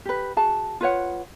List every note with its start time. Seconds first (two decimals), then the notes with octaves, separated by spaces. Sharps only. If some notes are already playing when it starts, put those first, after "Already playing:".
0.05 G4 B4
0.37 F#4 G#4 A5
0.81 F4 B4 C#5 F#5